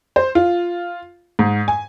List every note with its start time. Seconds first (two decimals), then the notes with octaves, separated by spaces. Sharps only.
0.16 C5
0.35 F4
1.39 G#2
1.68 G#5